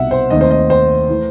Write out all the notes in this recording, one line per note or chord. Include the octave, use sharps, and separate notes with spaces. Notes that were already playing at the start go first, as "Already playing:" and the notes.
Already playing: C2 B2 G3 D#4 E5 F#5
C5
D#2 D#3 A3 C4 D#5
C5
D#5
C5
E3 A3 E4